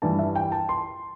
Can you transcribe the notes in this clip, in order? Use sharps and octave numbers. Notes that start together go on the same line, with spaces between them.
G2 E3 G3 A5
E5
G5
A5
C6